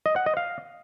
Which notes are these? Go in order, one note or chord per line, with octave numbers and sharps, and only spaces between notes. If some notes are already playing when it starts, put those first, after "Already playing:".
D#5
F#5
D#5
F5